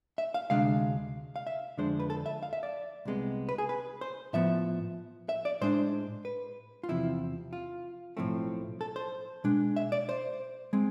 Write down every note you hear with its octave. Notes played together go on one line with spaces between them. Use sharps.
E5
F5
D2 C3 G#3 D4 F5
F5
E5
F2 D3 G#3 D4 C5
B4
A4
E5
F5
E5
D5
C2 C3 G#3 B3
B4
G#4
B4
C5
A2 F3 B3 E5
E5
D5
A2 G#3 D4 C5
B4
F4
E2 C3 F3 E4
F4
B1 A2 F3 A3 C4
A4
C5
B2 G#3 D4
E5
D5
C5
G#3 C4